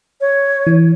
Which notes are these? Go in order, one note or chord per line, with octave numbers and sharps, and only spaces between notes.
C#5
E3